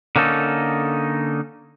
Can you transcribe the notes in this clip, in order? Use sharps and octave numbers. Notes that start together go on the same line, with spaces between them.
D3 A#3 C#4 D#4 A4